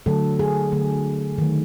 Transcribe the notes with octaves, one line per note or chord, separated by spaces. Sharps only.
D3 F#3 A3 A4
G#4
D3 F#3 A3
D#3 F#3 A3